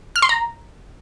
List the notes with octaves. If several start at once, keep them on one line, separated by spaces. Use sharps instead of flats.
F6
C6
A#5